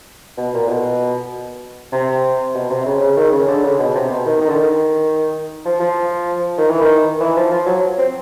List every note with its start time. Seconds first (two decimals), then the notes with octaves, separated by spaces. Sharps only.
0.38 B2
0.54 A#2
0.68 B2
1.92 C3
2.55 B2
2.70 C3
2.86 C#3
3.01 C#3
3.17 D#3
3.32 C#3
3.48 D3
3.64 C#3
3.79 B2
3.95 C3
4.10 B2
4.26 D#3
4.41 D#3
4.49 D3
4.55 D#3
5.65 F3
5.80 F3
6.58 D#3
6.70 E3
6.82 D#3
7.20 E3
7.36 F3
7.52 F3
7.66 F#3
7.98 C4